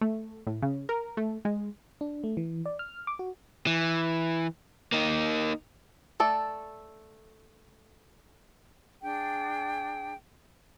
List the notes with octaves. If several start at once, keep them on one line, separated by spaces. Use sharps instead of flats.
A3
A2
C#3
A#4
A3
G#3
D4
A3
E3
D5
F6
D6
F#4
E3
A#3 D#4
A3 A4 D5
D4 G#4 G5